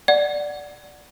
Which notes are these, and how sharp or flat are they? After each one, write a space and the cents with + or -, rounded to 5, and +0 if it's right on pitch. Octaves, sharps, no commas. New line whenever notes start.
D5 +0 F#5 +0